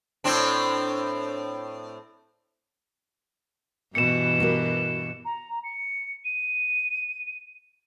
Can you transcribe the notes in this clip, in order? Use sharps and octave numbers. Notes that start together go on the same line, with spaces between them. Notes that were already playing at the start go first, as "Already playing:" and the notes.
A2 C4 D4
G2 B2 E3 C#7 E7
F#4 G4 A#4
A#5
C#7
D#7